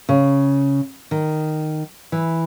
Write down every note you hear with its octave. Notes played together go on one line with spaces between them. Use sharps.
C#3
D#3
E3